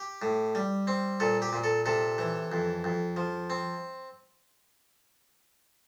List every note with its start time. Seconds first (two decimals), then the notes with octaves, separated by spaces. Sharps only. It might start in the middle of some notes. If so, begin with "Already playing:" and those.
Already playing: G4
0.22 A2
0.55 G3
0.87 C4
1.20 A#2 A4
1.42 G4
1.53 A#2
1.64 A4
1.86 C3 A4
2.18 E3
2.52 F2
2.84 F2
3.17 F3
3.50 C4